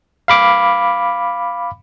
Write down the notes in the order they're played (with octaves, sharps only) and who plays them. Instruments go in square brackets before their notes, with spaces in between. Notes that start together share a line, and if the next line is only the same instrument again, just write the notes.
[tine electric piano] F5 B5 D6